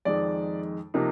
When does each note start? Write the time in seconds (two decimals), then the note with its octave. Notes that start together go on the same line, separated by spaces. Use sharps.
0.05 F2 D#3 G#3 D#4 D5
0.94 C3 F3 A#3 D#4